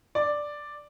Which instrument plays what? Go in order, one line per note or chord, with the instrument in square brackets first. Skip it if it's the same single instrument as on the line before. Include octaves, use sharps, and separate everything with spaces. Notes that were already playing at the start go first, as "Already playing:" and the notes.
[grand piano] D5